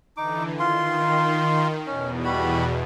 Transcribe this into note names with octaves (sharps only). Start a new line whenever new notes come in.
D3 E3 D#4 D6
D#3 F4 C6
E2 B2 C#4
G3 F#4 B5